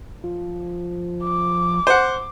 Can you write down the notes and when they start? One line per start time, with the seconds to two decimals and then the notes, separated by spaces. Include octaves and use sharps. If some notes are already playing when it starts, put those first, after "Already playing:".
0.24 F3
1.23 D6
1.87 C5 F#5